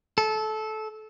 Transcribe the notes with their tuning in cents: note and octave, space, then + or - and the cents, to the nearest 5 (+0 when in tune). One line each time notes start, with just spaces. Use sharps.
A4 -20